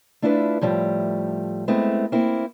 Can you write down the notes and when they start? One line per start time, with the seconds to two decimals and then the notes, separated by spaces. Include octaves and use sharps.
0.22 A3 D4 E4 F4 A4 B4
0.61 A2 F3 G3 A3
1.68 G#3 A3 B3 C4 E4
2.12 A#3 C4 E4